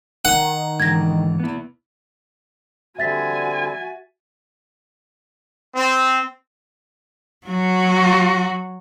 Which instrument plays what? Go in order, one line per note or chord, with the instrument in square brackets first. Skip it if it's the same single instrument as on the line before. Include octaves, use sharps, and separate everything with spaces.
[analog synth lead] D#3 [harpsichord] F#5
[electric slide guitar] G#2 D3 E3 [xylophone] G#6 A#6
[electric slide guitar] B3 E4
[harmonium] D3 G3 C4 [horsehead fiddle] F#4 G#5 [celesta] E5 A6 B6
[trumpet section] C4
[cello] F#3 F#4